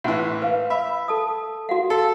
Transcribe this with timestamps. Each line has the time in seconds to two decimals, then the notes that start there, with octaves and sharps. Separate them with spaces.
0.04 A2 E3 F#5 C6
0.42 B4 F5
0.70 E5 B5
1.08 A4 A5 D#6
1.69 F#4 F5 F#5
1.90 A4